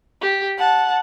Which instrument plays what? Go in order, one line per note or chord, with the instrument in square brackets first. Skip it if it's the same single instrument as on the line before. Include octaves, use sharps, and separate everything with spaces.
[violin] G4
F#5 A5